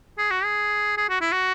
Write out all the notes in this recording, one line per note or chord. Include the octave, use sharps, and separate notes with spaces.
G#4
F#4
G#4
G#4
F#4
E4
F#4